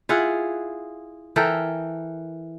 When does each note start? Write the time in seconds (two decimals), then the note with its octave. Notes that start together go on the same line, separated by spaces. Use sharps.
0.09 E4 F4 G#4 F#5
1.36 E3 A4 A#4 G5